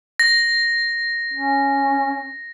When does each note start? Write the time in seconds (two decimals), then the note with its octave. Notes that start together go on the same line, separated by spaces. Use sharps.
0.20 A#6
1.34 C#4